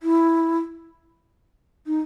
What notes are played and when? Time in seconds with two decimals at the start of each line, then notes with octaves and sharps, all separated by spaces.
0.03 E4
1.86 D#4